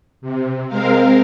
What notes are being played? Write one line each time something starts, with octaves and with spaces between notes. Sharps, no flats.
C3
G#3 C4 A#4 F5